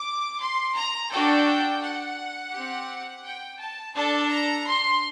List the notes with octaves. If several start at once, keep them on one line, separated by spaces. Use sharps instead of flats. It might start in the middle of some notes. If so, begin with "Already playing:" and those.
Already playing: D6
C6
A#5
D4 F#4 A4 G5
F#5
C4 G4
G5
A5
D4 A4 A5
A#5
C6